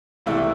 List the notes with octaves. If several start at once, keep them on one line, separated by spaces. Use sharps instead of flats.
C2 C3 E3 A3 E4